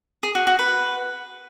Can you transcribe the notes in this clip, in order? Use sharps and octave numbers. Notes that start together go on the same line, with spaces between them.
G#4
F#4
F#4
B4